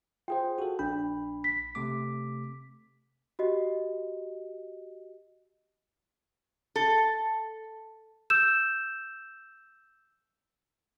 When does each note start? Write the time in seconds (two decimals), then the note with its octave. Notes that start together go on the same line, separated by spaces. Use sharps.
0.28 F4 G#4 C5 G5
0.58 F#4 A4
0.79 A#1 D4 B5
1.44 B6
1.75 C3 A3 D6
3.39 F#4 G4 D#5
6.76 A4
8.30 E6 G6 E7